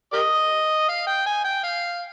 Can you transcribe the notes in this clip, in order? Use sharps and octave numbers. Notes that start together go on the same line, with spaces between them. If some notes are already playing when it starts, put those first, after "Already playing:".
G4 A#4 D#5
F5
G5
G#5
G5
F5